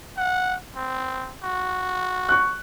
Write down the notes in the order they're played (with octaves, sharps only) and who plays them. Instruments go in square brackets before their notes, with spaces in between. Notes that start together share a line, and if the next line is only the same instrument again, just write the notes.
[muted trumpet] F#5
C4
F#4
[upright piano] C#6 F#6